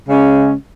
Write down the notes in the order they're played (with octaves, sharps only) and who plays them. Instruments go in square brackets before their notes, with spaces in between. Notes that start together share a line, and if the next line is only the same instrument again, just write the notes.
[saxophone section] C#3 G#3 C#4